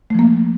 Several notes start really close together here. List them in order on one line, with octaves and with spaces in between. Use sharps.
A3 F3 A#3